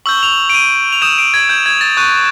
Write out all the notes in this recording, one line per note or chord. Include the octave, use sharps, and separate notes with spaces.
C#6 E6 G6 F#7
F7
D7
D#7
F7
D#6 G6 E7
D7
G#6
G6
G#6
A6
C#6 F#6 D#7